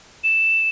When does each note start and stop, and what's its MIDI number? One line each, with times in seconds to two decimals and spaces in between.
0.24 0.69 100